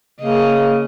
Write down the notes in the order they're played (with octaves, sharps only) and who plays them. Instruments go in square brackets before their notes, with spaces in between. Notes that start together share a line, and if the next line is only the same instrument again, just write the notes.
[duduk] C#3 [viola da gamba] A#3 D#5